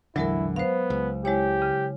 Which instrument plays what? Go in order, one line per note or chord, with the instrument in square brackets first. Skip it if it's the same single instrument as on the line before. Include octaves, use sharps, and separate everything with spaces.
[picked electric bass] A#1 E2 D3 [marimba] F#3 G#3 A#4 [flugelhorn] E4
[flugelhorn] B3 [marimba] C5 F5
[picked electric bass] C#2
[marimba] G#3 E4 C#5 [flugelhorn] G4
[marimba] C#3